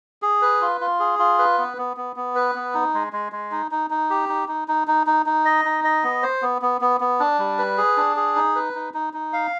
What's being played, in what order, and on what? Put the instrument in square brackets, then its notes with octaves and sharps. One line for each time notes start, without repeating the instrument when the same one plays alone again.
[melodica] G#4
B4
F4
F4
G#4
F4
B4
B3
B3
B3
B3
B4
B3
D#4
G#3
G#3
G#3
D#4
D#4
D#4
G4
D#4
D#4
D#4
D#4
D#4
D#4
D#5
D#4
D#5
B3
C5
B3
B3
B3
B3
D4
G3
B4
G#4
D4
G#4
D#4
B4
D#4
D#4
D#4
F5